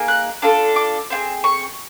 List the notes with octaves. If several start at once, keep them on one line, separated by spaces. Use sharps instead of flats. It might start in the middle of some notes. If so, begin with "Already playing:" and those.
Already playing: A#3 D#4 G#4
F#6
D4 F4 A4
D6
C4 F4 G#4
C#6